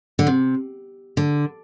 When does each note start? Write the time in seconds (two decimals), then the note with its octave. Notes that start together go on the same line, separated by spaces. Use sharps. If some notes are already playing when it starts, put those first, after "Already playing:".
0.19 D3
0.27 C3
1.17 D3